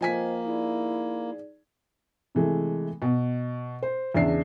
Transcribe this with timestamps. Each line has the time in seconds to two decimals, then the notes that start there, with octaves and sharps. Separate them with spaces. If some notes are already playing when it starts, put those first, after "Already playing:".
0.01 F3 A#3 C5 D#5 G5 G#5 B6
0.45 D#4 E4 G#4 D5
2.35 C3 E3 G#3 A3
3.02 B2
3.83 C5
4.14 E2 C#3 D4 E5 C7